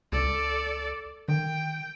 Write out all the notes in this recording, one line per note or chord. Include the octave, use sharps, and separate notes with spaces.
C#2 A4 D5
D#3 G5